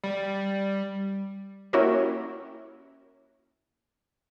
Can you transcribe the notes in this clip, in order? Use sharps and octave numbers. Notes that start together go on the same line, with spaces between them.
G3
A#3 C#4 E4 F#4 G4 A#4